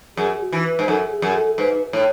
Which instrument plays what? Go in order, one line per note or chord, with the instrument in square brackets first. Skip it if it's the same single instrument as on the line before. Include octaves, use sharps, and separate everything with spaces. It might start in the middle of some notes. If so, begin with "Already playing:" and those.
[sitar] F#2 [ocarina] G#4
[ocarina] F#4
[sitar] E3
[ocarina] B4
[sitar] G#2
[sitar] F#2 [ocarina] A4
[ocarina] G#4
[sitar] F#2
[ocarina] A4
[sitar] G#2 [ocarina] B4
[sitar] A2 [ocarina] C#5